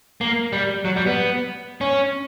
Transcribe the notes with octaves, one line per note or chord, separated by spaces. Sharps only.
A#3
G3
F#3
G3
B3
C#4